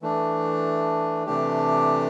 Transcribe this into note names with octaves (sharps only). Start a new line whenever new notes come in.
E3 A3 D4
C3 E3 A3 D4 G4